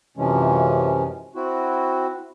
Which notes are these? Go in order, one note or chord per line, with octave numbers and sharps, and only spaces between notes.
F#2 C3 E3 F3 G#3 C#4
C4 E4 F#4